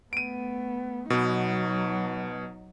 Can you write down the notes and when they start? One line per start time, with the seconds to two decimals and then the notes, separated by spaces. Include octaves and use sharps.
0.13 A3 B3 D7 D#7
1.10 B2 F#3 B3 D#4